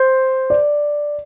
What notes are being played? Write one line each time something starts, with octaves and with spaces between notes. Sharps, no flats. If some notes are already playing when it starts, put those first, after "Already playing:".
Already playing: C5
D5